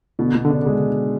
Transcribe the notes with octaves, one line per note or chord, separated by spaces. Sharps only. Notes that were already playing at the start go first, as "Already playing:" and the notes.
B2 D3
B2
D3
C#3 D4
G#3